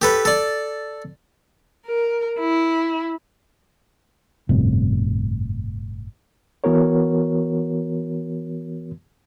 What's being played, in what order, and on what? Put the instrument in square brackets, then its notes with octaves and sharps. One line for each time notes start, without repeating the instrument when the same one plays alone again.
[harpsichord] G4 A4 B4
A4 D5
[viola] A#4
E4
[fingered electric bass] G1 F2 A2 C3
[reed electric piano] E3 B3 F#4 A#4 C#5